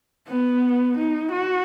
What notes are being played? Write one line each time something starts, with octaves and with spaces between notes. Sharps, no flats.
B3
D#4
F#4